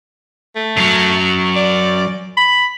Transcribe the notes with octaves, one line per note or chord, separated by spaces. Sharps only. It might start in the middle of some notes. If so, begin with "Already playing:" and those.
A3
F#2 F#3
D5
B5